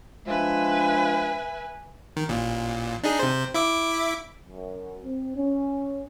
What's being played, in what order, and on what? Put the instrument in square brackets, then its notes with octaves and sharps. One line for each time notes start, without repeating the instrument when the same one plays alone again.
[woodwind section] F3 G#3 D4 [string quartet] B4 E5 G#5
[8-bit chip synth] D#3
A1 A#2
D4 D#4 G#4
C3 C5
E4 E5 D6
[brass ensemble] F#2
C4
C#4